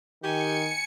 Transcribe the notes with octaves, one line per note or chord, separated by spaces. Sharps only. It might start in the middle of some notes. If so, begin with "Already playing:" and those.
D#3 G4 G#5 C#7